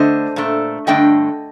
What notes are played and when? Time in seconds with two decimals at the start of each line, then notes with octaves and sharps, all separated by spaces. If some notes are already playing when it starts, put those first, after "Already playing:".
Already playing: D3 A3 D4 C5 D#5
0.36 A#2 A3 D4
0.87 G2 D3 A3 D4 D#5 G5